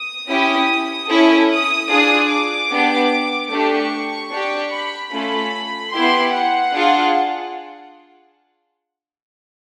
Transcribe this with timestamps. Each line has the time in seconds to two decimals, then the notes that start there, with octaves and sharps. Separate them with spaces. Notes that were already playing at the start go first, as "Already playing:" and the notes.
Already playing: D#6
0.28 C#4 E4 G4
1.09 C#4 E4 A4
1.48 D#6
1.89 D4 F4 G#4 D#6
2.30 D6
2.71 B3 D4 G4
3.51 A3 D4 G4 C#6
4.31 D4 G4
4.72 B5
5.12 A3 C#4 F4 A4 B5
5.93 B3 E4 G4 C6
6.33 F#5
6.74 D4 F4 G#4